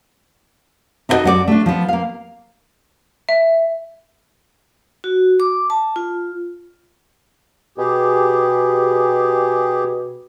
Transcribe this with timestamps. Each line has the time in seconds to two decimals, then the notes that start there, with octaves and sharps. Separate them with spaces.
1.09 D#4 E4 F#4 G#4 A4 D#5
1.24 F#2 F#4 G#4 D5
1.48 A3 D4
1.66 F3 B3
1.89 A#3 F5
3.29 E5
5.04 F#4
5.40 D6
5.70 A5
5.96 F4
7.78 B2 G4 G#4